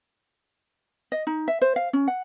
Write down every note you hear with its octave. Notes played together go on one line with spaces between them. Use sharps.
D#5
D#4
E5
C5
F5
C#4
F#5